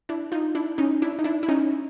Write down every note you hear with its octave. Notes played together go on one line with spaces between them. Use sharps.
D4 E4
D#4 F4
D4 E4
C#4 D#4
D4 E4
D#4
D4 E4
E4
C#4 D#4